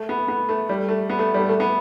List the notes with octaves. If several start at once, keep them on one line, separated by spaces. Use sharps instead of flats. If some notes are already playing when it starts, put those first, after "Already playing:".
Already playing: A3
B3
B3
A3
G3
A3
B3
A3
G3
A3
A3
B3